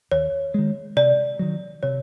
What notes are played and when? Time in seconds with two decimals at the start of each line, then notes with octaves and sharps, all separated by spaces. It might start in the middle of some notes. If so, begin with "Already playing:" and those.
0.12 D#2 C#5
0.54 D#3 G#3
0.96 C3 D5
1.39 D#3 F#3
1.83 C3 C#5